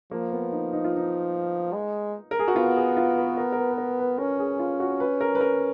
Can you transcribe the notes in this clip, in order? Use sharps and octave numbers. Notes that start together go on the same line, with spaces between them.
F3 A#3
B3
D#4
D#4
F4
D#4
G#3
A#4
G#4
F#4
B3 F4
G#4
F4
B4
A#4
A#4
B4
B4
A#4
B4
C#4 A#4
G#4
F4
F#4
B4
A#4
B4
A#4